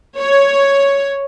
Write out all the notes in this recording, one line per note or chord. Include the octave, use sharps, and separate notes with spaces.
C#5